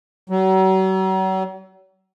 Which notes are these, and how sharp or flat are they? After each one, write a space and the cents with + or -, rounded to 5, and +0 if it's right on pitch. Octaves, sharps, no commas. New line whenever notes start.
F#3 +40